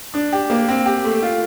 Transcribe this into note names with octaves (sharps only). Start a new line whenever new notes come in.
D4
G4
A#3
C4
G4
A3
F4